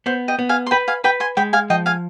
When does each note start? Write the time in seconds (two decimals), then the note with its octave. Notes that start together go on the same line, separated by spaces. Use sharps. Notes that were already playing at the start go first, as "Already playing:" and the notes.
0.06 B3 C5
0.28 D#5 G5
0.39 B3
0.49 F5 G#5
0.66 C6
0.71 B4 G5 B5
0.88 F5 G#5
1.04 B4 G5 B5
1.20 G#5 C6
1.37 G#3 G5 B5
1.53 F5 G#5
1.70 F3 D#5 G5
1.86 F5 G#5